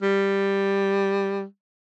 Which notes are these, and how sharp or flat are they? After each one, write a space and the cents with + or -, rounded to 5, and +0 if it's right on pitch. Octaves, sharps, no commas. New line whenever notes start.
G3 +10